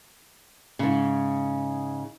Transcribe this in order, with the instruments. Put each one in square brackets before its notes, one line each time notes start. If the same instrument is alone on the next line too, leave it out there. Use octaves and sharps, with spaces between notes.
[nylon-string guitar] G#2 C#3